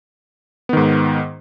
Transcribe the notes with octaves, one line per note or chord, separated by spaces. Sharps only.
G#2 D#3 B3